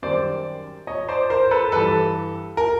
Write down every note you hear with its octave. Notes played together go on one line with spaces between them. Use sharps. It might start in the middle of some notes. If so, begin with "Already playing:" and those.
F#2 D#3 G3 C5 D5
C#5 D#5
C5 D5
A#4 C5
A4 B4
G2 E3 G3 A4 B4
A#4